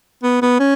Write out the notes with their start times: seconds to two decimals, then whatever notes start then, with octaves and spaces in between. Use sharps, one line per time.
0.23 B3
0.42 B3
0.60 C#4